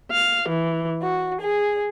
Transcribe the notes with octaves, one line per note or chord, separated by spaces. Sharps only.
F5
E3
F#4
G#4